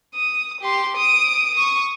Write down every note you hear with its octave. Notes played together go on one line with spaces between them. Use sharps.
D#6
G4 C6
D#6 D7
C#6 D#6